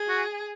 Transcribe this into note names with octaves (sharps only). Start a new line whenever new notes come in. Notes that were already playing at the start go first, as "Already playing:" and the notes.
Already playing: G#4
F#4